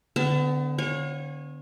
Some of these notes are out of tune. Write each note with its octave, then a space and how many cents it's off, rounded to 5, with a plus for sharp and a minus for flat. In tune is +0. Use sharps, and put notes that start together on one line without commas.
D3 +0 B3 +40 A5 +0
C#5 -25 F5 +35 G#5 +0